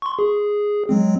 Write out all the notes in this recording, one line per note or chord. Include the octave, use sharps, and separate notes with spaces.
C6 C#6
G#4
F#3 G#3 C4